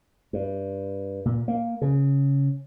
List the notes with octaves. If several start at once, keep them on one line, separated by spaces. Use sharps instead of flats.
G2
A#2
A#3
C#3